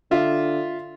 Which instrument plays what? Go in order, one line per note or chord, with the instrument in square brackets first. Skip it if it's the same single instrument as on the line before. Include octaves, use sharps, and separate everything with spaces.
[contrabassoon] D3 [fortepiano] F4 E5